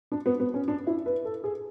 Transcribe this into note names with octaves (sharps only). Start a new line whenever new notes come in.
D4
B3
B3
C#4
D4
E4
B4
A4
G#4